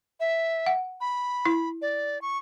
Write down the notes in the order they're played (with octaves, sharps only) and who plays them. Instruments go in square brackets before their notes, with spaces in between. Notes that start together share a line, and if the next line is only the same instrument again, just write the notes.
[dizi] E5
[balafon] F#5
[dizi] B5
[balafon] E4
[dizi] D5
C#6